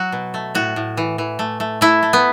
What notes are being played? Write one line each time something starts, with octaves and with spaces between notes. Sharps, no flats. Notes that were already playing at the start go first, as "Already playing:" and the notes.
Already playing: F#3 F#4
B2
A3
A2 F#4
A2
E3
E3
A3
A3
A3 E4
A3
B3